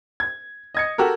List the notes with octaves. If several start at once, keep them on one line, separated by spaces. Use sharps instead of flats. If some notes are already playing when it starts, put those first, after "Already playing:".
G#6
D#5 G#6 C#7
F#4 G4 A4 A#4